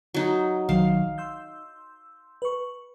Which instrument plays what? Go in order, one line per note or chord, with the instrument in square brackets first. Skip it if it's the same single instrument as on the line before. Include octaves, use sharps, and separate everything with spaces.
[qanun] F#3 D#4
[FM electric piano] B1 D#3 F#3 [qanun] F5
[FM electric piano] C6 E6 G6
B4 C#6